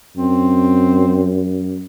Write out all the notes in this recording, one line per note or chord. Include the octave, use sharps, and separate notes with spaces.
F#2 C4